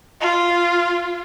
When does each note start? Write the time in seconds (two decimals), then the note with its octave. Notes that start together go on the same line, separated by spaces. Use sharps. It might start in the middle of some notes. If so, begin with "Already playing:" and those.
0.21 F4